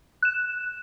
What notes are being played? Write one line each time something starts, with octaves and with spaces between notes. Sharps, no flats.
F#6 E7